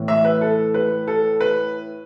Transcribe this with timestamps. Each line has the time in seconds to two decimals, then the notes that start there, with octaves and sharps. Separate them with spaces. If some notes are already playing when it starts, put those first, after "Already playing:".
Already playing: A2 E3
0.08 E5
0.25 B4
0.41 A4
0.74 B4
1.07 A4
1.40 B4